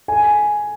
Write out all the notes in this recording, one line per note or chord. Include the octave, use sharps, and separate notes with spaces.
G#5